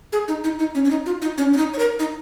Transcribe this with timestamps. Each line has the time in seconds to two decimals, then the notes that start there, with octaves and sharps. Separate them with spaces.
0.13 G#4
0.28 D#4
0.44 D#4
0.59 D#4
0.75 C#4
0.85 C#4
0.90 D#4
1.06 F4
1.22 D#4
1.38 C#4
1.53 C#4
1.57 D#4
1.73 C#5
1.79 A#4
1.99 D#4